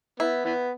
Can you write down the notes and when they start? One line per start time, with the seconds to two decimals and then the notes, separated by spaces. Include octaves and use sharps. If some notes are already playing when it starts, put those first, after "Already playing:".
0.20 B3 E4
0.45 E3 B3